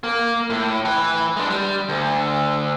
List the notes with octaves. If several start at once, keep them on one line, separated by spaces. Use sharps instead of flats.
A#3
A2
E3 B4
G#3 D4
G3
D2